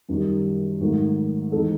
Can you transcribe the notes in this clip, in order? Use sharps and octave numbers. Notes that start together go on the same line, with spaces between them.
F#2 D#3 G3
G#2 D#3 F#3 A3
E3 G#3 C4 D#4 A4